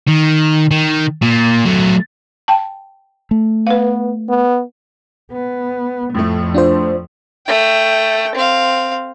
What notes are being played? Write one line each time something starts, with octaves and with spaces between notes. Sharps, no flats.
D#3
D#3
A#2
F#3 A3
G5 A5
A3
B3 B4 F5
B3
B3
F2 A2 F3 A3
D4 F4 C5
A3 G5
C4 F5